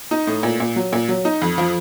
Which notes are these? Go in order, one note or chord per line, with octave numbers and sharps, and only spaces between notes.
D#4
A2
A#2
A#2
F#3
A#2
F#3
D#4
F2
F3